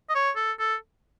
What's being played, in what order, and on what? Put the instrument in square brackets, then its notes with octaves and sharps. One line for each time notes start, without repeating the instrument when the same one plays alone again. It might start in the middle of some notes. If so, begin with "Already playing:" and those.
[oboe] D#5
C#5
A4
A4